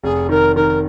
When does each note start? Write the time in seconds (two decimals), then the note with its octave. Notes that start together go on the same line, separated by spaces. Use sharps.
0.04 F1 G#4
0.29 D#3 A#4
0.55 D#3 A#4